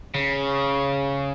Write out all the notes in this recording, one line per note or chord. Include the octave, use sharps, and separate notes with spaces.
C#3